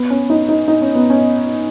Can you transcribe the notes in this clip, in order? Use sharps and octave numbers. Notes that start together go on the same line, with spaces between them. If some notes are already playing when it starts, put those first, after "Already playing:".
Already playing: B3
C#4
D#4
D#4
D#4
C#4
B3
C#4